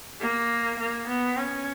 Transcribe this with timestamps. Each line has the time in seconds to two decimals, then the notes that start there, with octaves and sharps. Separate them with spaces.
0.21 A#3
0.79 A#3
1.07 B3
1.37 C#4